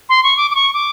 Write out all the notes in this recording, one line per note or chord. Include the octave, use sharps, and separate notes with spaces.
C6
C#6
D6
D6
C#6
D6